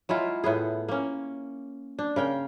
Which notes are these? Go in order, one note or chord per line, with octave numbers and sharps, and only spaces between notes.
F#3 G#3 E4 F4
A2 B3 G#4
A#3 C#4
D4
C#3 A#4 G5